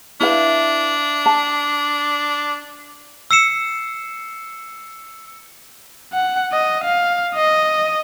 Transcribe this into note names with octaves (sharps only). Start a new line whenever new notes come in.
D4 E4 B4 F5
A5
E6 C7 C#7 E7
F#5
D#5
F5
D#5